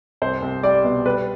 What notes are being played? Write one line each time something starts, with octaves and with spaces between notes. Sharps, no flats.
C2 C5
C2
G3 D5
B2
G3 B4